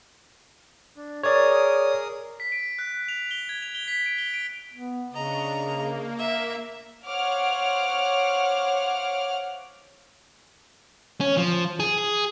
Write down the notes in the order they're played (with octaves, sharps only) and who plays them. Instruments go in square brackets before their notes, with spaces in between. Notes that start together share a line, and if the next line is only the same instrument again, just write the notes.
[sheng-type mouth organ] D4
[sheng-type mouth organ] G#4 A#4 D#6 [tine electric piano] C#5 D5
[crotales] B6
D7
F#6
F7
G7
G#6
F7
G7
B6
D7
G7
D7
[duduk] B3
[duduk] C#3 [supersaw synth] D4 C#6 [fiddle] D#5 A#5
[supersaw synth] A#3
[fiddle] E5
[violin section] C5 C#5 F5 F#5 D6 F6
[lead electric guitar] C#4
F3
G#4
G#4